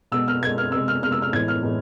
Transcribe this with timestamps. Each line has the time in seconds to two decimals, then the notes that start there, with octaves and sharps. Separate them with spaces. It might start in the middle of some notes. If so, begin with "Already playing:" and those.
0.12 B2 G#3 E6
0.28 F6
0.42 B2 G#3 G#6
0.58 F6
0.72 C3 G#3 E6
0.88 F6
1.02 C3 G#3 F6
1.12 E6
1.22 F6
1.33 A2 E3 G#3 G#6
1.48 F6
1.63 A2 E3 G#3